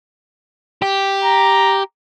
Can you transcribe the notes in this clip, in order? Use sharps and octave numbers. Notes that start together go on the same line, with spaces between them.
G4
A#5